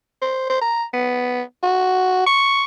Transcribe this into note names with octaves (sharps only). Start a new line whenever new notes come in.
C5
C5
A#5
B3
F#4
C#6